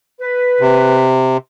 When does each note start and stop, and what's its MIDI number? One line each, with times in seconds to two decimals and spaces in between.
0.20 1.11 71
0.60 1.37 48